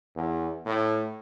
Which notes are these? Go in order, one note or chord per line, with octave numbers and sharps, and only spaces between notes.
E2
A2